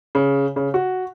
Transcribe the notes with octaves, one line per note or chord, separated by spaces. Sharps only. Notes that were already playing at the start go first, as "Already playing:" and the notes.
C#3
C#3
F#4